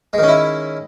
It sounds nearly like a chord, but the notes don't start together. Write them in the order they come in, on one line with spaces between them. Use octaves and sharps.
G#3 D#3 C#4 E4